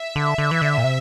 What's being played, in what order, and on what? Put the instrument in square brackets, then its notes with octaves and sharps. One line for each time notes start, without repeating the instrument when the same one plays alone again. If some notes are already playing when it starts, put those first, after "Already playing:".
Already playing: [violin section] E5
[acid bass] D3
D3
E3
D3
A#2
C3